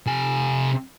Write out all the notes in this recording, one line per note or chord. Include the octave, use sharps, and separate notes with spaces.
C3 G#5